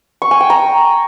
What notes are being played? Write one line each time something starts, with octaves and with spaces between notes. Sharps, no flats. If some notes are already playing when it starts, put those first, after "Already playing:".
C#6
G#5
G5
A#5